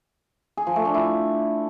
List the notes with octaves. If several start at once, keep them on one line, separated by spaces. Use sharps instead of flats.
G#4
F3
A3
D4
E4